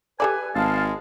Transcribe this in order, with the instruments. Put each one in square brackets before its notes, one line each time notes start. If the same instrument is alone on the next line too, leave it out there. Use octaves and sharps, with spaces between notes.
[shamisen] G4 A4 D5 [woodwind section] B4 G#5
[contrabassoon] G#1 [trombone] G#3 [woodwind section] F5 A5